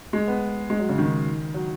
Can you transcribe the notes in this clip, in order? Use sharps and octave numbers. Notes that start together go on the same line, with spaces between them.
G#3
B3
G#3
F#3
C#3
D#3
F#3